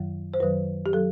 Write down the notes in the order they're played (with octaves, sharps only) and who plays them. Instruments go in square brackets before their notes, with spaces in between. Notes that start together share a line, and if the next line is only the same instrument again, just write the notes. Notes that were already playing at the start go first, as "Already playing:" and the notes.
Already playing: [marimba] F#2 D#3 F#3
C5
F#2 D#3 F#3 B4
G4
F#3 A4